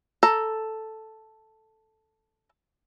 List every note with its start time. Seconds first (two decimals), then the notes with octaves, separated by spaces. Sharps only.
0.23 A4 A#5